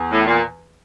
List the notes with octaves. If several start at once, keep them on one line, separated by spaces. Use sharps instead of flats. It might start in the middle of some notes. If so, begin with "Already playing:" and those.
Already playing: E2
A2
A#2